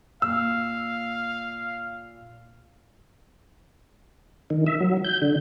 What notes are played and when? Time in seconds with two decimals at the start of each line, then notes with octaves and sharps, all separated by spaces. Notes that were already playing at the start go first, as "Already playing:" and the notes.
0.22 A#2 F5 E6
4.50 D#3
4.67 E5
4.81 F#3
5.05 G6
5.22 D3